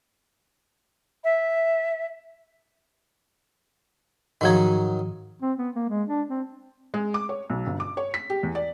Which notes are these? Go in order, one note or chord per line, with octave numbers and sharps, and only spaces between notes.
E5
G#2 D#3 F3 F#3 D#4
C4
B3
A#3
G#3
D4
C4
G#3
D6
C#5
B1
G1
D6
C#5
B6
G4
E2
D5